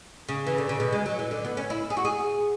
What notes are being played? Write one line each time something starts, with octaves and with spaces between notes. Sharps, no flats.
C#3
E3
D3
C#3
B2
G#3
F#3
E3
D3
B3
C#4
E4
G#4
F#4
G#4